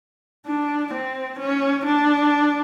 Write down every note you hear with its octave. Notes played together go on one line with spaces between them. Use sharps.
D4
C4
C#4
D4